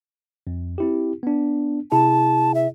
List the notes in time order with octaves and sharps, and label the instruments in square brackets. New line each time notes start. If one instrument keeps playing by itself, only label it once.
[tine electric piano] F2
C4 E4 G4
B3 D4
[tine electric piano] C3 E4 G#4 [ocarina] A5
[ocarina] E5